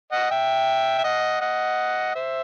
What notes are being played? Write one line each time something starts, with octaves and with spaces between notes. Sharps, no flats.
D#5 F#5
E5 G5
E5
D#5 F#5
D#5 F#5
C5 E5